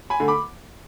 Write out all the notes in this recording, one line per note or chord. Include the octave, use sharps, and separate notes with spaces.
G#5 B5
D3 A3
B5 D6